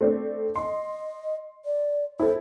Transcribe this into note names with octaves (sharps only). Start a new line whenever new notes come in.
A3 C4 D4
D#5 C6
D5
E4 A4 C5